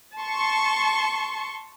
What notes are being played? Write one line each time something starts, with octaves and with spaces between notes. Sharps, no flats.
A5 C6 C#6